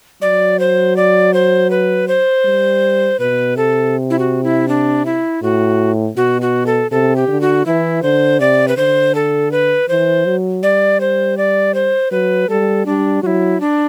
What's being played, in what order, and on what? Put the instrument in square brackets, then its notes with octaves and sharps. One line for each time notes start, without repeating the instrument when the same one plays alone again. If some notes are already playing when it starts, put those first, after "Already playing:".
[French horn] F#3 [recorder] D5
[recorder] C5
D5
C5
B4
C5
[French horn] G3
[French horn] B2 [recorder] B4
[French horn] C3 [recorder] A4
[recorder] E4
F#4
E4
D4
E4
[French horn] A2 [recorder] F#4
[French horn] B2 [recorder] F#4
[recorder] F#4
A4
[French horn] C3 [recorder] A4
[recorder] G4
[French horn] D3
[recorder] F#4
[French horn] E3 [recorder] E4
[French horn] D3 [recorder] C5
[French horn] C3 [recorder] D5
[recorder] B4
[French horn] D3 [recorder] C5
[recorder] A4
B4
[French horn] E3 [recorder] C5
[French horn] F#3
[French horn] G3 [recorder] D5
[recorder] C5
D5
C5
[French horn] F#3 [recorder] B4
[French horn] G3 [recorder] A4
[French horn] G3 [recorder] D4
[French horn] F#3 [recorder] E4 F#4
[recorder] D4